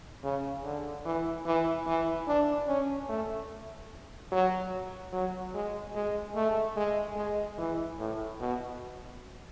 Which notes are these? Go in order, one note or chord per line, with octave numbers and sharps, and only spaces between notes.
C#3
D3
E3
E3
E3
D4
C#4
A3
F#3
F#3
G#3
G#3
A3
G#3
G#3
E3
A2
B2